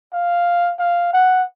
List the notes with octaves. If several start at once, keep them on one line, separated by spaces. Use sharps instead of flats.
F5
F5
F#5